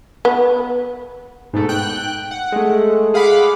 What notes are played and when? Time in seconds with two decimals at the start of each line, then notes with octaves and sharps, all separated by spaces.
0.25 B3
1.53 G#2 B2 A3
1.69 G5 F#6
2.31 F#5
2.52 G#3 A3
3.14 G#4 F5 F#5 B5 D6